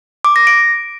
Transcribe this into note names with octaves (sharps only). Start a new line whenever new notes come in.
D6
A#6
D7